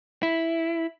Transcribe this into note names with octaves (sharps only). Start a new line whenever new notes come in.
E4